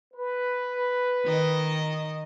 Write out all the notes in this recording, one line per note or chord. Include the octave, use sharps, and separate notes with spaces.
B4
D#3 D#5